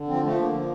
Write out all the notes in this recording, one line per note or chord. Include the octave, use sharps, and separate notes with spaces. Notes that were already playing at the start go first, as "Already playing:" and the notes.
Already playing: D3
F3 C4
F3 A3
D3 A#3
F3